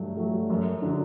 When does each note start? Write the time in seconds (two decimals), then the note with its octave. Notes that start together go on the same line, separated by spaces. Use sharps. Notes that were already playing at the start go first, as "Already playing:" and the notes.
Already playing: G2 F#3 A3
0.17 F#3 A3
0.50 F#2
0.82 D3 F#3